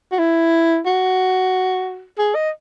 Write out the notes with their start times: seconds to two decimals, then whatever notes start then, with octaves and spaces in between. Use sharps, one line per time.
0.12 F#4
0.19 E4
0.86 F#4
2.18 G#4
2.35 D#5